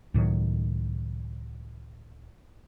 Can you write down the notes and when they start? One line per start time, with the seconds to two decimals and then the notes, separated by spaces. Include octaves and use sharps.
0.14 C#2 A2 D#3 F#3